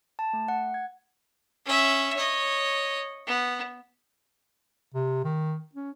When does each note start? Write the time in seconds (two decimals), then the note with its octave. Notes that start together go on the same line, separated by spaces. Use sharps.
0.19 A5
0.33 A3
0.48 F#5
0.74 G#6
1.65 C#4 E5
2.17 C#5 D#5
3.27 B3
4.94 C3
5.24 D#3
5.75 C#4